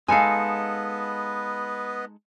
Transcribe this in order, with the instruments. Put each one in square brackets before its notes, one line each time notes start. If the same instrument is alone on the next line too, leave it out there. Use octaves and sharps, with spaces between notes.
[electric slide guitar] G#3 D#4 A4 [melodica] B3 B4 D#5 [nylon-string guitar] F5 G#5